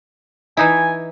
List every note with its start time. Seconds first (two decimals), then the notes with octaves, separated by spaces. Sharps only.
0.57 E3 D#4 E4 G#5